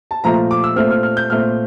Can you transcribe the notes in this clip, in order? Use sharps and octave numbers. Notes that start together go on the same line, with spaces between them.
A5
A#2 F3 A3 A#5
D6
E6
A#2 A3 C4 F6
F6
F6
G6
A#2 A3 C4 F6